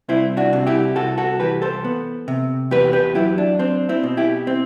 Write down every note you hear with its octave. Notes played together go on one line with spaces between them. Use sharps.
C2 C4 E4
D4 F#4
C3
E4 G4
C2 F#4 A4
F#4 A4
E3 G4 B4
A4 C5
B3
C3
E2 G4 B4
G4 B4
F#3 E4 G4
D4
C4 D4
C4 E4
B2
E4 G4
C4